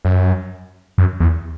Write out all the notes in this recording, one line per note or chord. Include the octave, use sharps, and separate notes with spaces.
F#2
F#2
E2